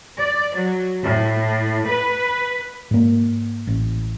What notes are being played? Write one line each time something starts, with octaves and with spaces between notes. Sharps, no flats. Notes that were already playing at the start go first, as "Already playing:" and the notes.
D5
F#3
A2
B4
G#2 A#3
A1